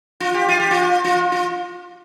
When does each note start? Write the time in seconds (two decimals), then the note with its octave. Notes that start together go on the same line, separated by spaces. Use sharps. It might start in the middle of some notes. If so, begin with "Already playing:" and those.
0.20 F4
0.34 G4
0.48 F4
0.60 G4
0.71 F4
1.04 F4
1.32 F4